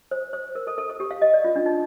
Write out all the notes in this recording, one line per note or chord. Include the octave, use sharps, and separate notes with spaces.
C5
C5
A#4
A4
A4
A4
G4
F5
D#5
D5
F4
D4
D#4